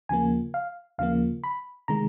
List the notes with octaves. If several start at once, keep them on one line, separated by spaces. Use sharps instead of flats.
D#2 C#3 F3 A#3 G#5
F5
D#2 C#3 F3 A#3 F5
B5
C3 D#3 G#3 A#5